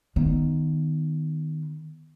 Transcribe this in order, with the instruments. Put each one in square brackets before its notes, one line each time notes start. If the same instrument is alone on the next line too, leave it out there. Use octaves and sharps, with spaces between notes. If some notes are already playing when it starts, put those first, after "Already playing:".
[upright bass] D#3 B3